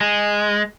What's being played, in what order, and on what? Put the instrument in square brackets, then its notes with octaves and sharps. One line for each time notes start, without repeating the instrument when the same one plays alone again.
[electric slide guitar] G#3